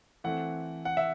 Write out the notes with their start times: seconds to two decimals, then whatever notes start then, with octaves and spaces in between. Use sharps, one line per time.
0.24 E3 A3 C4 F#5
0.85 F#5
0.97 E5